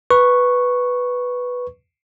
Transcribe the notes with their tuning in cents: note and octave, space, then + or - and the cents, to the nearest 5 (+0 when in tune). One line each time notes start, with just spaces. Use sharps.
B4 +0 C#6 -5